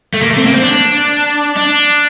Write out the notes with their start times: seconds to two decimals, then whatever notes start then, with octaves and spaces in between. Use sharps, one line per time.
0.14 A3
0.22 A#3
0.31 A3
0.38 C4
0.46 A#3
0.54 C4
0.62 D4
1.57 D4